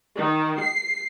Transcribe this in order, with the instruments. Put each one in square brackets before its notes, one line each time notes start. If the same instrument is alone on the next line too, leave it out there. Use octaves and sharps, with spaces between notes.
[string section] D#3
C7